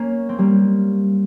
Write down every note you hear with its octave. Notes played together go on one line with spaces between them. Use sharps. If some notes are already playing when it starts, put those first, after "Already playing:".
Already playing: A#3 C#4
C4
G3 A#3